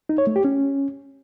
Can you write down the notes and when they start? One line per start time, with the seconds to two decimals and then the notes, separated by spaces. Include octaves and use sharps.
0.09 D#4
0.18 C#5
0.27 A3
0.36 G4
0.45 C#4